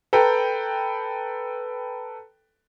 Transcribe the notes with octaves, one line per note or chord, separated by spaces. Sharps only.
A4 B4 G5 A#5 B5